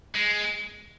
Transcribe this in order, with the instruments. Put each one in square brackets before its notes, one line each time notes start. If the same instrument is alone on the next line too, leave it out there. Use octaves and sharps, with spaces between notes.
[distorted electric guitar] G#3